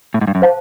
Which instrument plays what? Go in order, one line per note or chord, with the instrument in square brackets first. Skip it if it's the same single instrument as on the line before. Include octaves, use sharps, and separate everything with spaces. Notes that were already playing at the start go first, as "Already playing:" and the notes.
[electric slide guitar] A2
G#2
G2
F#2
[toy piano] C5 F5 A5